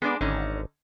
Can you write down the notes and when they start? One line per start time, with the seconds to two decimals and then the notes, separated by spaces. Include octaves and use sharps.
0.02 G#3 B3 D4 D5
0.21 G#1 D3 C#4 D#4